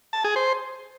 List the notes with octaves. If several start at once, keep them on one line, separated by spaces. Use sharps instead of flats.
A5
G#4
C5